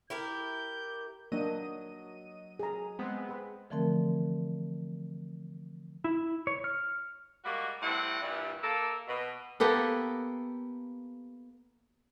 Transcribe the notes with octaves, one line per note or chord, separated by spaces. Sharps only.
E4 G4 A#4 G6
F#3 A#3 D4 D#5 D#7
G#4 A#5
G#3 B3 C4
G#4 B5
D3 E3 F3 A3 C4 A#4
E4
C#5
F6
G3 G#3 A#3 F#4
A2 G3 C4 E4 F#5
G2 A#2 E3 G3
A#3 A4
B2
A#3 B3 G4 A4